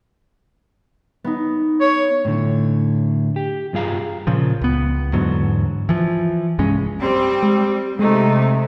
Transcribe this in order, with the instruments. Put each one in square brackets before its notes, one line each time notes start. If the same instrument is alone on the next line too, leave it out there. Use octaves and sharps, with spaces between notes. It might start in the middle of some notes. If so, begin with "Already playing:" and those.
[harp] B3 D#4
[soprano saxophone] C#5
[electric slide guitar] A2 D3
G4
G2 G3 F4 G#4 F5 A#5
[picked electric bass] A#2 C#3 F3
C#2 B3
E2 G#2 D3 F#3
E3 F3
C2 G2 G#3 C#4
[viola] G3 [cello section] C4
[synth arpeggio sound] G#3
[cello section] C3 [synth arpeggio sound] G#3 [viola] A3 D#4